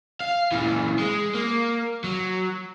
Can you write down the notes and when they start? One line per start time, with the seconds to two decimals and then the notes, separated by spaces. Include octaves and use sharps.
0.21 F5
0.52 A#2 E3
0.99 G#3
1.34 A#3
2.04 F#3